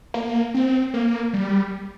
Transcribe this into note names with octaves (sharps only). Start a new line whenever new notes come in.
A#3
C4
A#3
G3